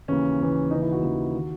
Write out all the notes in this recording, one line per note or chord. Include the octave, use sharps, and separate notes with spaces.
D#2 C#3 E3 C#4
D#2 C#3 E3
D#2 C#3 E3 D#4
E4
F#4
D#2 C#3 E3
D#3